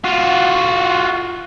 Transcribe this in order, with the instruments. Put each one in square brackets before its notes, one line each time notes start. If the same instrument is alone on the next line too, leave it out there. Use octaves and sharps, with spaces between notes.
[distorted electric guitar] F4 F#4